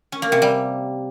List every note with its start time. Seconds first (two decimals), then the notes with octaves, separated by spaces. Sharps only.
0.12 C#4
0.22 A#3
0.32 C3
0.42 G3